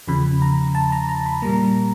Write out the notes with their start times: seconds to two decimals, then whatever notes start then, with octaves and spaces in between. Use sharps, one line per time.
0.08 E2 C#3 F3 B5
0.42 A#5
0.75 A5
0.92 A#5
1.09 A#5
1.26 B5
1.42 A#2 G3 A#3 A#5